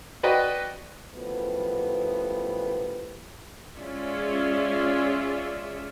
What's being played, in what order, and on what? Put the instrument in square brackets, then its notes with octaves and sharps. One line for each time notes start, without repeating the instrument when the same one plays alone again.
[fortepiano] F#4 B4 D5 D#5 G5
[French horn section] F#2 A2 F3 G3 B3
[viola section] G#3 C#4 F4 G#4 D5 E5